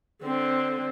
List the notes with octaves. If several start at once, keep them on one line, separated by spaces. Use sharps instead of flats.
D3 C4